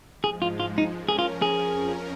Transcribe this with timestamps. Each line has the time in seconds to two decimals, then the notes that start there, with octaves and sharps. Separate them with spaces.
0.24 G#2 F3 G#3 G#4
0.42 F4
0.60 F4
0.78 D#4
0.95 F3 C#4 A#4
1.09 G#4
1.19 F4
1.42 G#4
1.66 F2 F3 C#4 A#4